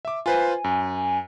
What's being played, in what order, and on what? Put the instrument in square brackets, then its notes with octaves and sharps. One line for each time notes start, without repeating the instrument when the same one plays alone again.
[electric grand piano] E5 D6
[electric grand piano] F4 B4 C5 [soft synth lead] G#5
[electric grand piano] F#2